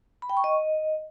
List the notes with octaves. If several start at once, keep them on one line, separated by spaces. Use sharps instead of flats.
B5
G5
C#6
D#5